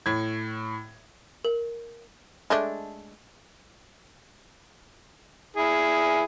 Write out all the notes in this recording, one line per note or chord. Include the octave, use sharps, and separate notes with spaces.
A2 G#6
A#4
G#3 A3 D4
E4 G#4